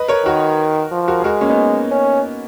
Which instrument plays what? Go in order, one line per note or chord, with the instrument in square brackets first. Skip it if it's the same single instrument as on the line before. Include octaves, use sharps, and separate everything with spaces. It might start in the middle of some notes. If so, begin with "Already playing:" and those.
Already playing: [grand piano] B4 D#5
A#4 C#5
[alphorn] D#3 [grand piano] F#4 A#4
[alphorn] F3
[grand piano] F#4 A#4
G#4
[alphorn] G#3 [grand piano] F#4 A#4
[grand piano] A#3 C#4
B3 D#4
[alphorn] C#4